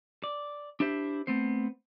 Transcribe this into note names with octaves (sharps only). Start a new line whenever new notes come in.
D5
D4 E4 G4 C5 E5
A3 B3 C4 C5